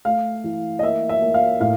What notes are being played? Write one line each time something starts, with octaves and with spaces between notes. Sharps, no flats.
A3 F5
E3
D#5
A#3 E5
E5
A#3
F5
A2 F5